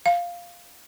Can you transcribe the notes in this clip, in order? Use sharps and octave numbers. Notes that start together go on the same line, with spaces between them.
F5